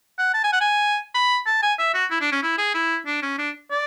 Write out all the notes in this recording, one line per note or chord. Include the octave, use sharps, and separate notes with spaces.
F#5
A5
G#5
F#5
G#5
B5
A5
G#5
E5
F#4
E4
D4
C#4
E4
G#4
E4
D4
C#4
D4
D5